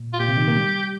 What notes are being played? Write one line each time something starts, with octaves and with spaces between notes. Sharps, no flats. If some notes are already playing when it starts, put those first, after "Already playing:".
Already playing: A#2
F4
A#2 G4
C3
D#3
A#3
G3